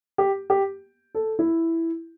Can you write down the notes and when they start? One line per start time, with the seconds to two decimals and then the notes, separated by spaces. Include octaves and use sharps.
0.18 G4
0.50 G4
1.15 A4
1.39 E4